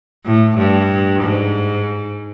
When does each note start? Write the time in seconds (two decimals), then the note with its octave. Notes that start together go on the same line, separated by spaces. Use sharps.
0.25 A2
0.57 G2
1.22 G#2